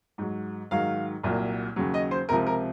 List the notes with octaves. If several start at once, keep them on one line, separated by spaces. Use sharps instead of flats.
G#2 F#3
G#2 D#3 F#3 F5
C2 A#2 F#3
D#2 C#3 F#3
D#5
C5
C#2 C3 F3 A#4
A#4